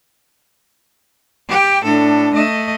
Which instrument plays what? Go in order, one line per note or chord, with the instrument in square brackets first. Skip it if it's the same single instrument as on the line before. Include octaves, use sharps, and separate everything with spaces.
[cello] G4 G5
[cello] A2 A4 [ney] D4
[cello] A3 D#5